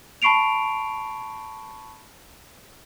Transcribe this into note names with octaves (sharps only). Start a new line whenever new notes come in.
A5 B5 C#6 C7 D7 F7